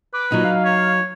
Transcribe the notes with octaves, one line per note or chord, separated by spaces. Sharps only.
B4 D6
A#2 F#3 D#4
F5
C#5